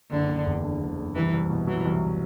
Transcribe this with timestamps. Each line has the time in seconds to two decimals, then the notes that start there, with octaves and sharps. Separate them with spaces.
0.11 F#1 D3
0.28 F#1
0.46 E2
0.63 D3
0.81 F#1
0.98 F#1
1.15 C2 E3
1.33 C2
1.50 B2
1.67 E3 F#3
1.85 C2